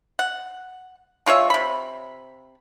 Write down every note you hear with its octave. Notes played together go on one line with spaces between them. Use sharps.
F#5
G#3 F4 C#5 E5
C3 B5